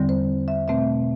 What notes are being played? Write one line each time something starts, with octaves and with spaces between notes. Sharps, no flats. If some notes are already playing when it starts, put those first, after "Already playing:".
Already playing: E2 D3 G3 C4
C5
E5
B2 A3 C4 E5